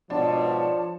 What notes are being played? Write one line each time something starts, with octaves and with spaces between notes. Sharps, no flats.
G#2 B2 F3 D4 C#5 A5